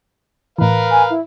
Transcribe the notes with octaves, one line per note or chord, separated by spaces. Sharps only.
A2 E3 A#4 B4 F5
G#5
E4